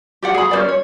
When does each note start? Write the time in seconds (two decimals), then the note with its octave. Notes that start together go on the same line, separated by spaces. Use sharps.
0.22 G4 D5 F#5
0.34 G#4 B5
0.51 C#4 C5 D5
0.69 C#5